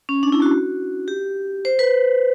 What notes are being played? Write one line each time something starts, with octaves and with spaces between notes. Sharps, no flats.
C#4
D4
E4
F#4
G4
C5
B4